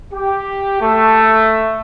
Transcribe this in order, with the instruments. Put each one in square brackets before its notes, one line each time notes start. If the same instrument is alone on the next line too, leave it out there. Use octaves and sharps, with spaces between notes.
[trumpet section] G4
A3